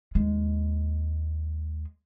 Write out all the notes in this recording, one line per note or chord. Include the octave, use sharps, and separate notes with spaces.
D#2 G#3